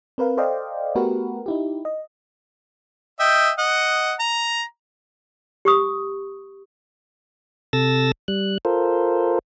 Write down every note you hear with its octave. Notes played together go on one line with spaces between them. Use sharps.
C4 A#4 B4 F5
A4 C5 D5 D#5 F5 G5
A3 B3 F#4 G4 A#4 B4
D#4 E4 G4
D#5
D#5 E5 G5
D#5 F#5
A#5
G4 C#6 D#6
C3 A4 E6 A6 A#6
G3 F#6
F4 A4 A#4 C5